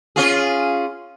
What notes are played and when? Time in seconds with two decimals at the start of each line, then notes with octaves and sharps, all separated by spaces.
0.16 C#4 F4 G#4